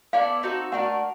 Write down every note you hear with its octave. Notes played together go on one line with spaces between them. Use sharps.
B3 E4 A4 D5 F5
C4 D#4 F#4 A4
A3 D4 F#4 A#4 F#5